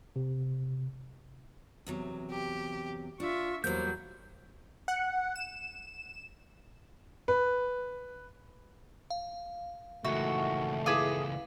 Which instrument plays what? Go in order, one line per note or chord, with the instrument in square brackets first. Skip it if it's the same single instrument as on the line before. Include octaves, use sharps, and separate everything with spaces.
[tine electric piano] C3
[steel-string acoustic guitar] E2 C3 F#3
[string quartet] G4
[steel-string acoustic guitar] D4 [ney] F4 [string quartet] E5 C#6
[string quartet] E2 F#3 [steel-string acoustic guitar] G3 A#3 [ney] C5 [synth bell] G6
[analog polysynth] F#5
E7
[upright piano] B4
[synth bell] F5
[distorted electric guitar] C#2 E3 [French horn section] D#3 A3 [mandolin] F#4 [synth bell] E5
[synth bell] E4 B4 F5 [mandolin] G#4 D6 D#6